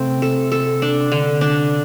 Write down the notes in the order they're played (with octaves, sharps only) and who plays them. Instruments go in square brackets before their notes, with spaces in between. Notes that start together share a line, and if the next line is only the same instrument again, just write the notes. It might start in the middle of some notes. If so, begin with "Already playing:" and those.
Already playing: [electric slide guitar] C3 [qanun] A3 C4
[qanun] A4
A4
D4
D3
D4